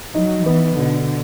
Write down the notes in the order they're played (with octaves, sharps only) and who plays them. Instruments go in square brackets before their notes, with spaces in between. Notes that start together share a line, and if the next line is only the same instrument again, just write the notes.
[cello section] F#3 [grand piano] D#4
[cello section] E3 [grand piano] B3
[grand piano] B2 [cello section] D3